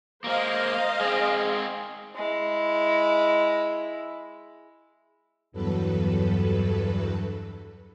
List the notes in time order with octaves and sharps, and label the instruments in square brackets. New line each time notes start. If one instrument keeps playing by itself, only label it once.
[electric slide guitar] G#3 A#3 [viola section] C5 D#5 F5
[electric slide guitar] G#3 C4 [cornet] G#4
[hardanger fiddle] G#3 E4
[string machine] E2 G2 F#3 A4 B4